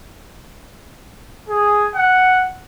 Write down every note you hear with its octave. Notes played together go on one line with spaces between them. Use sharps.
G#4
F#5